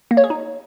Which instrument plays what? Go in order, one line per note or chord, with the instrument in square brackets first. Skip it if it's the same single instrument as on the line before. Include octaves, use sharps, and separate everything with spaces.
[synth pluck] A#3
C#5
G#4
D#4